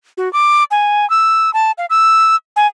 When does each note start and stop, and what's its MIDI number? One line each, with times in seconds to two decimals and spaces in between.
0.18 0.31 66
0.33 0.64 86
0.71 1.08 80
1.10 1.53 88
1.54 1.72 81
1.78 1.86 77
1.90 2.36 88
2.56 2.67 80